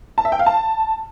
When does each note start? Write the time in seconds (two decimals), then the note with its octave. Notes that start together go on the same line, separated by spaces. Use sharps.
0.18 A5
0.25 E5
0.32 G5
0.39 F5
0.46 A5